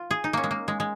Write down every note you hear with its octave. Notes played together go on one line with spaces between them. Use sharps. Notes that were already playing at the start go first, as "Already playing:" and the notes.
Already playing: F4
G#4
D#4
A#3 C#4
G#3
A#3
G#3
G#3